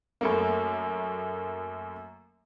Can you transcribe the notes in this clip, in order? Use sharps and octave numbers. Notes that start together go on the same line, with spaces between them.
F#2 A3 A#3